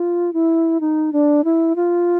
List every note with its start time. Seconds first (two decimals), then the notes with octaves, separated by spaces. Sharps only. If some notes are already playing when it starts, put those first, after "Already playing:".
Already playing: F4
0.33 E4
0.81 D#4
1.13 D4
1.44 E4
1.76 F4